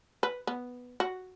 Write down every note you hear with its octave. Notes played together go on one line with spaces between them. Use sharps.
B4
B3
F#4